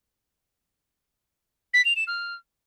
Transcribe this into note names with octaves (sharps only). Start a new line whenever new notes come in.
B6
F7
E7
F6